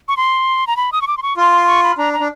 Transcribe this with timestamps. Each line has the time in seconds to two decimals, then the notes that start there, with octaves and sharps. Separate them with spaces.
0.08 C#6
0.17 C6
0.67 A#5
0.77 B5
0.92 D#6
1.02 C#6
1.07 D6
1.17 C6
1.23 C#6
1.37 F4 C6
1.52 C6
1.67 C#6
1.83 B5
1.97 D4 A#5
2.13 A#5
2.20 D4